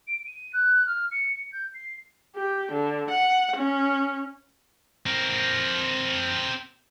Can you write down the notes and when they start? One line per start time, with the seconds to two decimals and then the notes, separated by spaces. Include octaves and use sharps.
0.07 D7
0.26 D#7
0.53 F#6
0.86 F6
1.11 C#7
1.35 C#7
1.52 G6
1.74 C7
2.36 G4
2.72 D3
3.11 F#5
3.56 C#4
5.06 C4 A#4